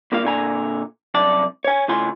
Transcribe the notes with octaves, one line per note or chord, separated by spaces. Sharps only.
G2 A#3 F4 F5
A#2 D3 G#5 A#5
C2 F#2 D5 A5
C#5 G#5
A2 C#3 F4 G#5 C6